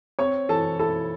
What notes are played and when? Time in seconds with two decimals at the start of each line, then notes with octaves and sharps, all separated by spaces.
0.19 C4 C#5 C#6
0.49 E3 A4 A5
0.79 E4 A4 A5